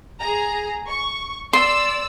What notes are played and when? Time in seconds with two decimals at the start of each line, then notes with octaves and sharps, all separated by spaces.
0.20 G#4 A#5
0.88 C#6
1.53 D5 C6 E6